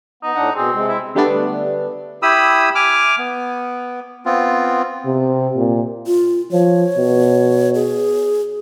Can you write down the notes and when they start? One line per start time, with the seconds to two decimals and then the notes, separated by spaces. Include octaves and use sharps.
0.23 B3 D#4
0.35 A2 D4 F#5
0.56 B2 C4 G#4
0.73 C3 G#3
0.88 E4
1.15 D3 G3 A3 B3 D4
2.22 E4 G4 B5 D#6 E6
2.75 G#5 D6 F6
3.18 B3
4.25 B3 C4 F4
5.06 C3
5.56 A#2
6.06 F4
6.52 F3 C#5
6.97 B2
7.75 G#4